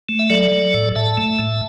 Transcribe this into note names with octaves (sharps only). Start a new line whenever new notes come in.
A3
E5
F#3 A4 D5
F#3
A2
A2 E5 A5
A3
A2